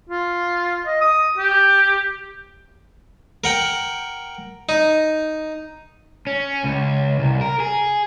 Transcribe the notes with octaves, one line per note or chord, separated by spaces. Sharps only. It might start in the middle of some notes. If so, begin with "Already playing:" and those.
F4
D#5
D#6
G4
A#4 F#5 G5
D#4
C#4
C#2
C2
A#4
G#4